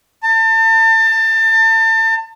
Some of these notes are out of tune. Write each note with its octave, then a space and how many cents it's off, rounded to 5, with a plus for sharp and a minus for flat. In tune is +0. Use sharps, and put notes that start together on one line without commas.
A5 +35